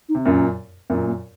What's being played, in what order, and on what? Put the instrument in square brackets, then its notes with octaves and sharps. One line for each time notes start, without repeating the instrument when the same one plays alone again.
[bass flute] D#4
[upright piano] C3
[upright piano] F#2 A#2 [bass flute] C#4
[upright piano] F#2 A#2 [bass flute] C4
[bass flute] A#3